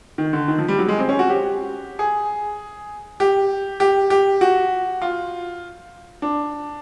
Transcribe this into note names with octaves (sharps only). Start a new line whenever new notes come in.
D#3
D3
D#3
F3
G3
F#3
G#3
C4
C#4
F#4
G4
G#4
G4
G4
G4
F#4
F4
D4